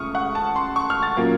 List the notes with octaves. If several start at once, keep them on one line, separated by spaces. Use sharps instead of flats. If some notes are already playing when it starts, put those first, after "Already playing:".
Already playing: C#2 C#3 A3 C#6 D#6 F6
F#5
A5
C6
C#6
F6
A6
A#2 F#3 A#3 C#4